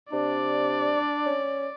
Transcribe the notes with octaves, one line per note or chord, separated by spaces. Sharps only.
C3 D4 D5
C#4